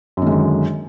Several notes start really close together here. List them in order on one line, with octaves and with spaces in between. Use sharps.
F#2 D#3 G#3 D3